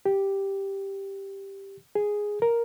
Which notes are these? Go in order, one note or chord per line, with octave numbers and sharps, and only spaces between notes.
G4
G#4
A#4